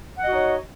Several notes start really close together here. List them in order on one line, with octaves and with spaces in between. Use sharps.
F#5 D#5 F#4 D#4 C#5